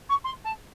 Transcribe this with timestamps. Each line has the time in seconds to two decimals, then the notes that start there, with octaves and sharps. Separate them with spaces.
0.09 C#6
0.24 C6
0.44 A5